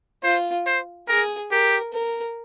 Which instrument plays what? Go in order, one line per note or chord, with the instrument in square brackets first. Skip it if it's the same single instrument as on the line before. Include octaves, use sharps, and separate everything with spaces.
[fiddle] F4 [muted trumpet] C5
[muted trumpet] C5
[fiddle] G#4 [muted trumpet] A#4
[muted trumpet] G4 [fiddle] A#4
[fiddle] A#4